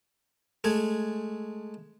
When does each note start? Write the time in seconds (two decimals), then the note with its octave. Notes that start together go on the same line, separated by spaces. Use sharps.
0.64 G#3 A3 G#5